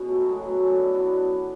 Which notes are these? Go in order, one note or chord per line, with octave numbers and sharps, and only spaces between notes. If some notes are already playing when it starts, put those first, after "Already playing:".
Already playing: B2 B3 C#4
A3
F#3
G#3 B3
F#3
A3 C#4
E4
B2 B3 D4
F#3 B3 D4